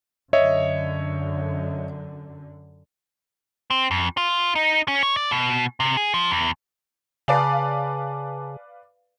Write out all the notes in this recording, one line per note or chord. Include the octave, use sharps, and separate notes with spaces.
F#2 D3 C#5 D#5 E5
C4
F2
F4
D#4
C#4
C#5
D5
B2
C3
G#4
F3
E2
C#3 B4 D5 F5 G#5 A5 D6